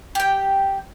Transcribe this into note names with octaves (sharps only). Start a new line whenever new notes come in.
G4 G5